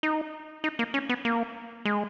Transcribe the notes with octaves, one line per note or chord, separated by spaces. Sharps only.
D#4
D#4
A#3
C#4
B3
A#3
G#3